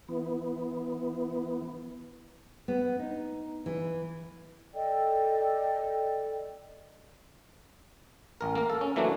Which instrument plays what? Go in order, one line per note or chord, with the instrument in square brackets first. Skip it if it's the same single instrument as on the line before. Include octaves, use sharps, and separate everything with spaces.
[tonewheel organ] E3 B3
[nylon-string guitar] B3
D#4
E3
[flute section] A4 D5 D#5 G5
[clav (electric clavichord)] A1 A#4
A#3 A#4
A4
C#4
E3 F#3 A3 A#3 D4